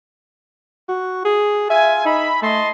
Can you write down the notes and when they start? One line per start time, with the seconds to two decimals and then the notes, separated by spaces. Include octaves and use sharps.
0.89 F#4
1.25 G#4
1.70 F4 E5 G#5
2.05 D#4 E5 B5
2.42 A3 D#5 A5 C6